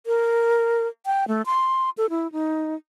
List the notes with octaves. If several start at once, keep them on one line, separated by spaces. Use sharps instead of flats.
A#4
G5
A3
C6
A4
E4
D#4